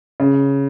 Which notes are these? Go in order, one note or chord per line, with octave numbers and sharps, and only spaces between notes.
C#3